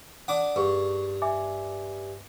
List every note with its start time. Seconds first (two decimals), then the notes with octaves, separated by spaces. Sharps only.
0.28 D4 F#5 D6 D#6
0.56 G2 G#4 C#6
1.22 E5 G#5 D6